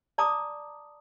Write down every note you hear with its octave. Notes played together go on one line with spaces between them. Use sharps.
D5 A5 A#5 D6 D#6